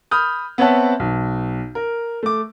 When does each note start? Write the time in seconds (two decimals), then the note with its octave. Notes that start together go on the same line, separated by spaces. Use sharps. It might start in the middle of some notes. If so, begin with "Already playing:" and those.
0.11 B5 D#6 F6 G6
0.58 B3 C4 C#5 E5 F#5 A5
1.00 B1
1.75 A#4
2.23 A3 D6